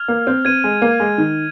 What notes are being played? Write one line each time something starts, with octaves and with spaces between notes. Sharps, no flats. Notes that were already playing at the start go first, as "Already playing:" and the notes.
Already playing: F6 G#6 F7
A#3
C4
C4 G#6 D#7
G#3
A#3
G#3
D#3